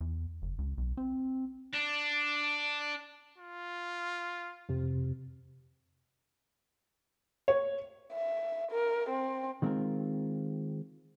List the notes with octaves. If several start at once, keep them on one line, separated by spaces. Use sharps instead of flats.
E2
F#1
C#2
B1
C4
D4
F4
F2 C3
C#5
E5
A#4
C4
D#3 G#3 C4 C#4 F4 A#4